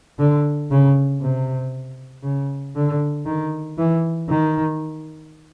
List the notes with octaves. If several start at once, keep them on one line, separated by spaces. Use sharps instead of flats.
D3
C#3
C3
C#3
D3
D#3
E3
D#3